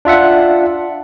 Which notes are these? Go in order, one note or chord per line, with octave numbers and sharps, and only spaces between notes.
D4 F4 E5 F#5